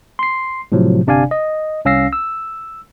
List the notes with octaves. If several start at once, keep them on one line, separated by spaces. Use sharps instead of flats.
C6 C7
A2 C3 F3 F#3
G1 C3 D4 D5 F5 G#5
D#5
C2 C#4 F5 E6 A#6 C7
E6